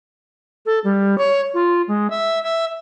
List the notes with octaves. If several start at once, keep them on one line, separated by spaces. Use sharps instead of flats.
A4
G3
C#5
F4
G#3
E5
E5